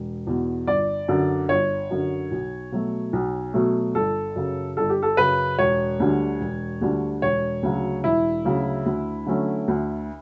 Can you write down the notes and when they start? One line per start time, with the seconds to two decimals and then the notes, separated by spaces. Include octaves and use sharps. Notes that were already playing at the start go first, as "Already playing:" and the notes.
Already playing: E1
0.27 E2 B2
0.67 G1 D5
1.08 F#2 D3
1.49 G1 C#5
1.91 F#2 D3
2.31 B1
2.72 B2 F#3 A3
3.13 B1
3.54 B2 F#3 A3
3.95 G1 A4
4.36 F#2 C#3
4.77 G1 A4
4.90 G4
5.02 A4
5.17 F#2 C#3 B4
5.59 E1 C#5
6.00 D2 D3 G3 D4
6.41 E1
6.81 D2 D3 G3 D4
7.22 E1 C#5
7.63 D2 C#3 F#3
8.04 E1 E4
8.45 D2 C#3 F#3
8.86 D2
9.26 D3 F#3 A3 C#4
9.68 D2